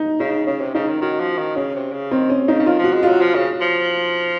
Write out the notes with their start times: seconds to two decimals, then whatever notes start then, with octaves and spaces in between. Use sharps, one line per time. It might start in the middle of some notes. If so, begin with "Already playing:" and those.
Already playing: D#4
0.20 C#3 D#4
0.47 C#3 C#4
0.61 C3
0.75 C#3 D#4
0.88 D#3
1.01 D#3 F#4
1.20 F3
1.38 D#3
1.56 C#3 C#4
1.75 C3
1.93 C#3
2.11 D#3 C4
2.30 C#4
2.48 C#3 D#4
2.59 C#3
2.66 D#3 F4
2.79 F3
2.84 F#4
2.93 G#3
3.03 F#3 F4
3.21 F3
3.35 C#3
3.61 F3